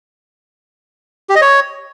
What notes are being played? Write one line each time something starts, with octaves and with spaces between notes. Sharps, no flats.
G4
D#5
C#5